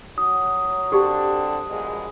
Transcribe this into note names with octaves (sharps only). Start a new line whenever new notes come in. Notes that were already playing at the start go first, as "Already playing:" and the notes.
F#3 D#6
D3 C4 D4 F#4 G4
A#1 B2 G#3